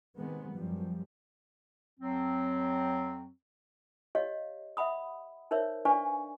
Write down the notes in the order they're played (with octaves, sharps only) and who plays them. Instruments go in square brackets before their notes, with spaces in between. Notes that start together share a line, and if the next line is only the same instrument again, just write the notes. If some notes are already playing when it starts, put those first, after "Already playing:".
[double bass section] C3 D#3 G#3 B3
F#2 F3 G3
[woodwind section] F2 F#3 C4
[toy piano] G4 C#5 D#5 F5
E5 F#5 B5 D#6
D#4 A#4 C5 C#5 E5
D4 B4 D5 F5 G#5 C#6